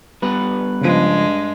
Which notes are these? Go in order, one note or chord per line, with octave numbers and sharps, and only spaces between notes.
G3 B3 B4
G2 C#3 F3 G#3